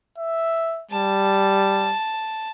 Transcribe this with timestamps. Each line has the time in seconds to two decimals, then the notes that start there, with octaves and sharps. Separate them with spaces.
0.18 E5
0.91 G3 A5